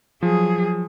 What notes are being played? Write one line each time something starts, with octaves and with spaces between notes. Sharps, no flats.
F3 F#3 G#4